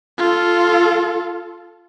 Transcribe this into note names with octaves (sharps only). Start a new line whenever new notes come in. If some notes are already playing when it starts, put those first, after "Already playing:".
F4 A4